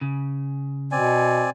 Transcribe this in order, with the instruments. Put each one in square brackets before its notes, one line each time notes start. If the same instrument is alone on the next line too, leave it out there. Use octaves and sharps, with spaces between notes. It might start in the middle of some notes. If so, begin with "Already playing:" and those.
[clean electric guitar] C#3
[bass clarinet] B2 [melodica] C4 D5 G#5